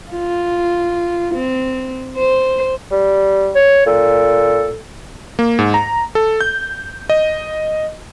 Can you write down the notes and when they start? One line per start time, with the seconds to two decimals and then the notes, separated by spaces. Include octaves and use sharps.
0.11 F4
1.34 C4
2.17 C5
2.92 G3
3.56 C#5
3.87 A#2 A4
5.39 A#3
5.59 G#2
5.74 A#5
6.15 A4
6.41 G6
7.09 D#5